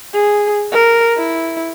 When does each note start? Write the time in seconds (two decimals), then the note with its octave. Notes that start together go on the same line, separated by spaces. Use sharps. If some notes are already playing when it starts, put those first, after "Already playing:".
0.13 G#4
0.72 A#4
1.17 E4